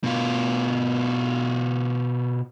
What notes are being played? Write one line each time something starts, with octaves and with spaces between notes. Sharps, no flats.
B2 F4